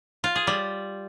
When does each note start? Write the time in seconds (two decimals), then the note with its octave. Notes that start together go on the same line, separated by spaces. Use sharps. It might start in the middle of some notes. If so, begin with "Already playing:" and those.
0.24 F4
0.36 G#4
0.47 G3